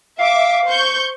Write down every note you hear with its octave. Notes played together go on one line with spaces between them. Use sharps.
E5 F5 D6
C5 C#6 G6